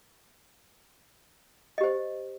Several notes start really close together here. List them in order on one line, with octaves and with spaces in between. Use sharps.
D#5 G4 C5